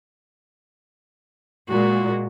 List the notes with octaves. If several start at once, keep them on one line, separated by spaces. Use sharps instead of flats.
A#2 G#3 F#4